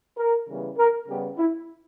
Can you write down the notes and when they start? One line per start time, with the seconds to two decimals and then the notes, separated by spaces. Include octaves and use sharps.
0.17 A#4
0.46 C#3 E3 G3 B3
0.77 A#4
1.07 C#3 G3 B3 G4
1.37 E4